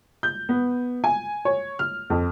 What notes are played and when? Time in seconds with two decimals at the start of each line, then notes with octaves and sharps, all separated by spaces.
0.23 G6
0.49 B3
1.04 G#5
1.45 C#5
1.79 F6
2.10 F2